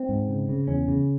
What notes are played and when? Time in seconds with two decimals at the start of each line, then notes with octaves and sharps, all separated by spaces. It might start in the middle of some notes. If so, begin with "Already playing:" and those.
Already playing: C4
0.09 G#2
0.28 C#3
0.49 C#3
0.68 E2 C#4
0.88 C#3